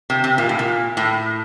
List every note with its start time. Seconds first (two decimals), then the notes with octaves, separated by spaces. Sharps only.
0.10 C3
0.24 C3
0.38 A#2
0.49 A2
0.59 A#2
0.97 A2